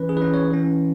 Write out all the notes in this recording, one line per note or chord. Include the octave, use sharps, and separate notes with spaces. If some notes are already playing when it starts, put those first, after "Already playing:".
Already playing: E3 C#4 B4
G#4
E3 B4
C#4
C#5
E3 C#4